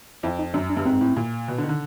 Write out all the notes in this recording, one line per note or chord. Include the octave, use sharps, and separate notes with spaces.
F2 E4
D#4
F#2 D4
D4
G2
G#2 C4
A2
A#2
B2
D3
D#3
D3